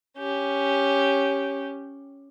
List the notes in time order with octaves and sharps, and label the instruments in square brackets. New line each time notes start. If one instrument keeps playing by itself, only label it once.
[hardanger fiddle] C#4 G4